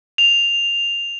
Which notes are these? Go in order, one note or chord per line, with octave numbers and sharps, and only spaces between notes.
F7